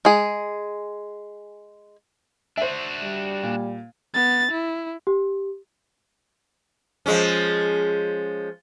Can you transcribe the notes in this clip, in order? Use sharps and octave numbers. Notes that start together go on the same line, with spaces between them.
G#3 G#4
D4 F#4 C5 E5
G3
A#2
B3 A6
E4
G4
F3 G#3 C#4